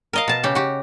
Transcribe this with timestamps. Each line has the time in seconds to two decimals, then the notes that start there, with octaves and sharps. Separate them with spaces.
0.13 A#4 D#5 F5
0.28 B2 A5
0.43 C#3 G4
0.55 F#4 G4